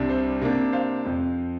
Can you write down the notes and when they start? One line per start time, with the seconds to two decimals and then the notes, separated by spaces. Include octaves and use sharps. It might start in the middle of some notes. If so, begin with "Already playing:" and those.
Already playing: C2 C3 G3 D4
0.09 C5
0.41 C3 A#3 D4
0.73 C5 F5
1.05 F2 F3 C4